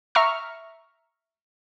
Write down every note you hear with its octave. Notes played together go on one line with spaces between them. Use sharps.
E5 A#5 C#6 F6